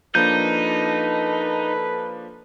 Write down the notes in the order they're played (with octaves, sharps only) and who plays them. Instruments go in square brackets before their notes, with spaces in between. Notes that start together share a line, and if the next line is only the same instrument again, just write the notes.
[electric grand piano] F3 A#3 D4 [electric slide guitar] D#4 [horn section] A4 B4 [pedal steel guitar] G6